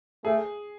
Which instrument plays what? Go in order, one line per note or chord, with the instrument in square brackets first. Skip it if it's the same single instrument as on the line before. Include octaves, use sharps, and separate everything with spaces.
[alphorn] A3 [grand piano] G#4